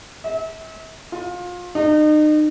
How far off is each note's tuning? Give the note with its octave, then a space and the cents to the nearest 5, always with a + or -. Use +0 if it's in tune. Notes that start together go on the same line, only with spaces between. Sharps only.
E5 -35
F4 +30
D#4 -35